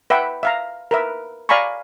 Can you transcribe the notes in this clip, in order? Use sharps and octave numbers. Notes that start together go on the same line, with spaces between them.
B4 E5 F#5 G5
E5 F5 A#5
A#4 B4 E5
D5 F5 G#5 A#5 B5 C#6